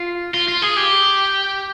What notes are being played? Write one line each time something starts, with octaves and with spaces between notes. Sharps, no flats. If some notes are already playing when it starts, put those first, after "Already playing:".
Already playing: F4
F4
F4
G#4
G4